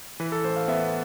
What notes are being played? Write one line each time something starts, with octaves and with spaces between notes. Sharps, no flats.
E3 B4
A4
A1 C5
F5
B3 E5